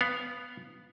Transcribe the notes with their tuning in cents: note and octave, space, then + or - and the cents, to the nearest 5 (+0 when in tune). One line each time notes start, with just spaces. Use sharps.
B3 +0 F5 +0